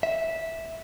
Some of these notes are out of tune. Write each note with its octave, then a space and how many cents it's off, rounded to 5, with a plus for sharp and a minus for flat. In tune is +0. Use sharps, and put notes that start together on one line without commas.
E5 -10